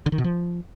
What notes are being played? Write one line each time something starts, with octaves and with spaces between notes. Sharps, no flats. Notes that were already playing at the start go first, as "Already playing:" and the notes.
D3
D#3
B2
F3